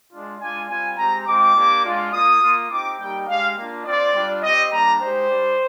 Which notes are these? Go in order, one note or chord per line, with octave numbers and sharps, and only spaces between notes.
G#3 D4 F4
G#3 D4 F4 G#5
G3 C4 F4 G#5
G#3 C4 G4 A#5
G#3 C4 F4 D6
A#3 D4 G4
G#3 D4 F4
A#3 F4 D#6
A#3 F4
C4 D#4 G4 D6
G3 A#3 D#4 G4 G5
G#3 D4 G4 F5
A#3 D4 F4
C4 F4 D5
G3 D4 F4
C4 G4 D#5
G3 A#3 D4 G4 A#5
G#3 D#4 G4 C5
G3 D4 G4